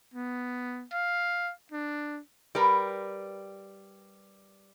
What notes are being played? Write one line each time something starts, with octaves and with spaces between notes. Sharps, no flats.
B3
F5
D4
G3 A#4 B4